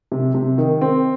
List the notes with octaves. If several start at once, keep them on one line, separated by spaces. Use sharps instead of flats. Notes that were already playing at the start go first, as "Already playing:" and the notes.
C3
C3
D#3
C4